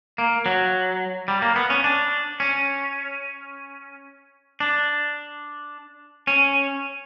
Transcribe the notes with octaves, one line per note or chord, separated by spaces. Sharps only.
A#3
F#3
G3
A#3
B3
C#4
D4
C#4
D4
C#4